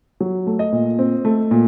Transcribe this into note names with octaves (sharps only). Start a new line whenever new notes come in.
F#3
A3
D#5
A#2
C4
A3
A#2